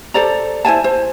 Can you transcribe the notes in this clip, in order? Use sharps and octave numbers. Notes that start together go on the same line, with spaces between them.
A4 C5 D5 A#5
E4 C5 G#5 A5
C5